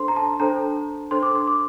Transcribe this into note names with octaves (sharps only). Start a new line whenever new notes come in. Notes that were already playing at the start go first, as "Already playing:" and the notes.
Already playing: D4 A4 C5 C6
A#5
A5
D4 A4 C5 A#5
D4 A4 C5 C6
D6
C6
D6